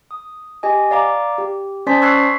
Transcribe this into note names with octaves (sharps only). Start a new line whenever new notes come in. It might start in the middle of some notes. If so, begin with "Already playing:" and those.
D#6
G4 D#5 G#5
D5 F5 A#5 D6
G4
C#4 C5 D5 A5 C6 B6
C#6 E6 F#6 G#6 B6 C7